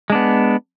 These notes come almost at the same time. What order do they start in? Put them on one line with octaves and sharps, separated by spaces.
G#3 D4 B3